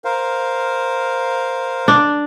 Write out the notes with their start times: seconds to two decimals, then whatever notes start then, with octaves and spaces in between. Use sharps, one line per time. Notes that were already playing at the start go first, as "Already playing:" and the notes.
0.05 A#4 C5 F5
1.88 D4